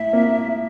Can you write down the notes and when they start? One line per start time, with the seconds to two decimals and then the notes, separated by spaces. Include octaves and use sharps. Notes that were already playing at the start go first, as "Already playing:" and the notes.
Already playing: A2 E5
0.13 A#3